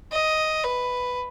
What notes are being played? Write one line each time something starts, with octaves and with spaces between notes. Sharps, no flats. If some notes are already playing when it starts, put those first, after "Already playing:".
D#5
B4